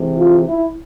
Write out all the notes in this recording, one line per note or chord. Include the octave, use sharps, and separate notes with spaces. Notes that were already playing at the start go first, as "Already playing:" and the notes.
Already playing: C3 E3 G#3
F4
E4